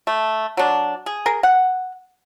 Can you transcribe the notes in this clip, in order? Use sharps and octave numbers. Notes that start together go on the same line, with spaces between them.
A3
F#3 D4
G#4
G#4 A#4
F#5